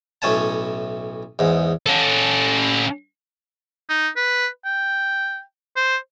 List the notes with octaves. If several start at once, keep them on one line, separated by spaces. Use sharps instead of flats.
B1 A2 C#4 G#5 A5
E2 G#2
C#4 A4
D#4
B4
G5
C5